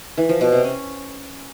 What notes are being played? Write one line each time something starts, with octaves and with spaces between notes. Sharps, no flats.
E3
F3
B2
C3
C#4